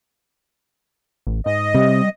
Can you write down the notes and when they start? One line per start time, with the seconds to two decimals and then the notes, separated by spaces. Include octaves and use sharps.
1.27 A1
1.46 G#2 D#5
1.74 C3 G3